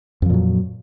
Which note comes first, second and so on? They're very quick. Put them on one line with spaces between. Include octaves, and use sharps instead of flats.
F2 F3 A#2 F#3